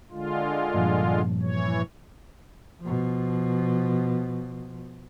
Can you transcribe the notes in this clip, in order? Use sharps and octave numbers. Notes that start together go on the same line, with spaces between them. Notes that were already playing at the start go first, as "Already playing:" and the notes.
D3 G#3 F4
G2 A#2 F3
E3 C#5
B2 F3